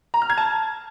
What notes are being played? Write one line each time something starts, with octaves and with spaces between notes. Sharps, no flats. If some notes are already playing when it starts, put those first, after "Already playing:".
A#5
F6
G#6
A5